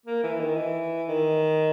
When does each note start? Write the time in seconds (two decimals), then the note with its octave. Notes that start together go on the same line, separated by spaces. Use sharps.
0.06 A#3
0.23 E3
0.40 D#3
0.57 E3
1.09 D#3